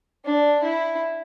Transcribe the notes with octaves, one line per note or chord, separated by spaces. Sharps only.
D4
E4